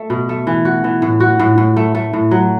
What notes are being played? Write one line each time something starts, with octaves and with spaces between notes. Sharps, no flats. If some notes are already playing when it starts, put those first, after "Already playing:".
Already playing: A3
B2
A3
E3
F#4
E3
A2
F#4
A2
A2
A3
A3
A2
F#3